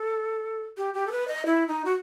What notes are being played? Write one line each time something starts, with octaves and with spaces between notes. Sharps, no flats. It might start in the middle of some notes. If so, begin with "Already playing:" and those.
Already playing: A4
G4
G4
A4
B4
D#5
E4
D#4
F#4